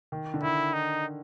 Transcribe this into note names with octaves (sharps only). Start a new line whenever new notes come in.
D#3
D3
D#3 E4
D#4